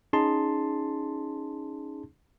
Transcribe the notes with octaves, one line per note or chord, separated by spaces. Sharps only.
C#4 D#4 G#4 A5 C6